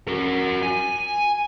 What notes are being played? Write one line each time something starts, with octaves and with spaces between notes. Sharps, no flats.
F#4 A#4
G#5